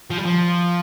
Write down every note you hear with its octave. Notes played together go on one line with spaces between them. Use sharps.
F3
G3
F3